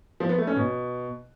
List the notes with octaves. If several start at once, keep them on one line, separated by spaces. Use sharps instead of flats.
F3
B3
A3
C#4
B2